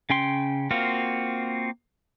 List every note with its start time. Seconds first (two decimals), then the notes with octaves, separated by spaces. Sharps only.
0.10 C#3 C#4 G5 C6
0.71 A#3 C4 F4 F#4